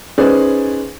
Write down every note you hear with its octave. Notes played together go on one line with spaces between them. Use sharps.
C#4 D#4 G#4 B4 C5 D5